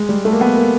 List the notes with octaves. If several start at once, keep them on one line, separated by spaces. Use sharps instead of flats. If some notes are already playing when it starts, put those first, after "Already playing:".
Already playing: G#3
G3
A3
A#3
B3
A#3